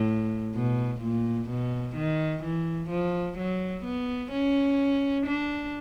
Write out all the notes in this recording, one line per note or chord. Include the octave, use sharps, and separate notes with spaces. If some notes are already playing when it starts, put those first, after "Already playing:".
Already playing: A2
B2
A#2
B2
D#3
E3
F3
F#3
B3
C#4
D4